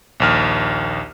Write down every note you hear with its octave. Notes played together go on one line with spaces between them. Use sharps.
A#1 D#2 F6